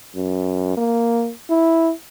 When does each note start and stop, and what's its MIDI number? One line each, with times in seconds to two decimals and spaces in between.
0.15 0.73 42
0.77 1.31 58
1.50 1.92 64